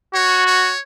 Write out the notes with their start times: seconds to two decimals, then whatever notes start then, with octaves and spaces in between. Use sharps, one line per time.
0.14 F#4 C#5
0.46 C#5